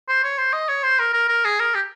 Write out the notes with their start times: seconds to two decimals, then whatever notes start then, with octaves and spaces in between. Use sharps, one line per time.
0.08 C5
0.24 C#5
0.38 C5
0.53 D#5
0.69 C#5
0.83 C5
0.99 A#4
1.14 A#4
1.29 A#4
1.45 G#4
1.60 A#4
1.75 G4